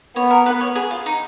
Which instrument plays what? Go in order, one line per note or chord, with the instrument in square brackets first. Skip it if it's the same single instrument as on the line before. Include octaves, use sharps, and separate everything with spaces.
[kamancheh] B3 [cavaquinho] C#5
[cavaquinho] A#4
B4
C#5
G#4
F4
D#4